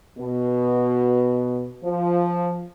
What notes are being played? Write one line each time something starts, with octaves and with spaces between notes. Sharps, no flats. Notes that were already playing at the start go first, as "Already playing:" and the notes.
B2
F3